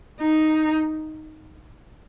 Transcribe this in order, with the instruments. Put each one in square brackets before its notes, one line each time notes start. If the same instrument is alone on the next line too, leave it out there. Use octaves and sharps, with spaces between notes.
[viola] D#4